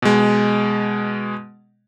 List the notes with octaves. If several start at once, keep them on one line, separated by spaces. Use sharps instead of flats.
B2 G#3